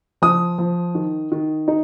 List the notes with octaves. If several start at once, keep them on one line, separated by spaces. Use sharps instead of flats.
F3 D#6
F3
D#3
D#3
D#4